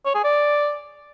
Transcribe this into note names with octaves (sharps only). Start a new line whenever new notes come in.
C#5
G#4
D5